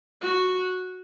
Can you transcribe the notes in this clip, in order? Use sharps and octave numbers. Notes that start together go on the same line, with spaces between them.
F#4